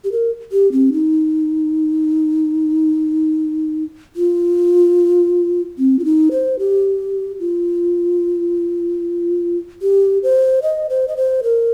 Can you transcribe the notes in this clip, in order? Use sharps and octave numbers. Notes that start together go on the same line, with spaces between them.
G4
A#4
G4
C4
D#4
F4
C4
F4
D#4
C5
G4
F4
G4
C5
D#5
C5
D#5
C5
A#4